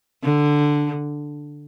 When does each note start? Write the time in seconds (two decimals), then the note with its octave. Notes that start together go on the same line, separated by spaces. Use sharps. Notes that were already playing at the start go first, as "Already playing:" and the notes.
0.23 D3